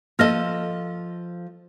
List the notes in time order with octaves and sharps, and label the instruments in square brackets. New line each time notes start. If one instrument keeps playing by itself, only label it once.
[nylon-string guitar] F3 A4 D#5 [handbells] A#3 F6 A#6